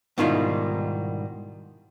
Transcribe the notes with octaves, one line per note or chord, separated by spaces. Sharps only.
G#2 B2 D#3 G3 E4 F4